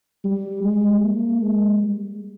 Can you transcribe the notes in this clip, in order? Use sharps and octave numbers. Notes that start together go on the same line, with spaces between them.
G3
G#3
A#3
G#3
G3